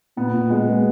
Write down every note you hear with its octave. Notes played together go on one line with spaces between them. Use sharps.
A#2 B3
A#2
G#3 F#4
B3